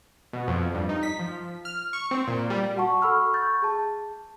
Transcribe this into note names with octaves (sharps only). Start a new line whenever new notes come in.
B2
F2
G2
D#4
B6
F3
F6
C#6
C4
A#2
G3
F#4 F#5 A5 C#6
A4 F#5 B5 C#6 E6 F6
C#6 G6 A6
G#4 A5